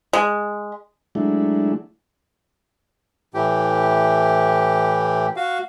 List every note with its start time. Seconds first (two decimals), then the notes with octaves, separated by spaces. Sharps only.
0.13 G#3
1.15 F#3 G#3 A3 D4 E4
3.34 A2 E3 G4
5.36 F#4 F5